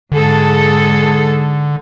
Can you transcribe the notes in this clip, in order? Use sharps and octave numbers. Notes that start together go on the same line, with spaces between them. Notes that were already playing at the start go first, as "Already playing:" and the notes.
G#2 D3 G#4 A4